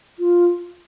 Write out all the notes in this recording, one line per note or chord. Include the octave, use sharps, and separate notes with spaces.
F4